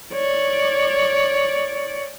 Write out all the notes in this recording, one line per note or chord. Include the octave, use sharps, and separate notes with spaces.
C#5 D5